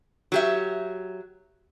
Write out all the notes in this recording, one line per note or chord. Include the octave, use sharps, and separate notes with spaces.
F#3 G4 E5